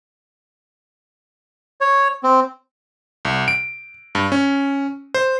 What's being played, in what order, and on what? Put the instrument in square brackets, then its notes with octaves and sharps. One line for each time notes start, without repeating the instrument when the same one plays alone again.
[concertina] C#5
C4
[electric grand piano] C2
D7
G2
C#4
C5